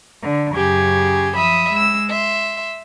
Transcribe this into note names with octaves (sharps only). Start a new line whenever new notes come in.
D3
F#2 C#3 G4 G#4 G#6
F3 E5 B5 D#6
G#3 E6
E5 C6